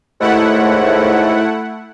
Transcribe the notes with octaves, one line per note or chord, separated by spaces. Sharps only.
D#2 G#2 A3 E4 F#5